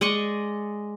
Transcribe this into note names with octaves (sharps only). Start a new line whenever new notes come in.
G#3 D5 D#5 C#6